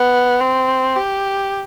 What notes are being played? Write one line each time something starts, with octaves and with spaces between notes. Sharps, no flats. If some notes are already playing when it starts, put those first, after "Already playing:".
Already playing: B3
C4
G4